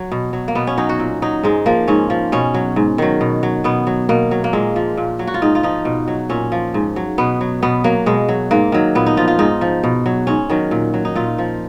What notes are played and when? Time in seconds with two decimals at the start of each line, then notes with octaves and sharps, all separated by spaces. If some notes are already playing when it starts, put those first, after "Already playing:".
Already playing: F#3
0.12 B2
0.33 F#3
0.48 A#3
0.55 B2 B3
0.67 C#4
0.78 F#3 D#4
0.89 F#4
1.00 A#2
1.22 F#3 D#4
1.43 G#2 G#3
1.66 F3 A#3
1.88 G#2 C#4
2.10 F3
2.32 B2 C#4
2.54 F#3
2.76 G#2
2.98 D#3 F#3
3.21 B2
3.43 F#3
3.64 B2 B3
3.87 F#3
4.09 B2 A#3
4.31 F#3
4.44 A#3
4.53 A#2 G#3
4.76 F3
4.97 A#2
5.19 F#3
5.27 F#4
5.34 F4
5.42 G#2 D#4
5.55 F4
5.63 F3 D#4
5.85 B2
6.08 F#3
6.30 A#2 C#4
6.52 F3
6.74 G#2
6.96 F#3
7.18 B2 B3
7.41 F#3
7.63 B2 B3
7.84 F#3 A#3
8.06 B2 G#3
8.29 F#3
8.51 G#2 A#3
8.72 D#3 F#3
8.95 A#2 B3
9.06 D#4
9.17 F3 F4
9.28 F4
9.39 G#2 D#4
9.61 F3
9.84 B2
10.06 F#3
10.27 G#2 C#4
10.50 D#3 F#3
10.71 A#2
10.94 F#3
11.05 D#4
11.15 A#2 F4
11.38 F3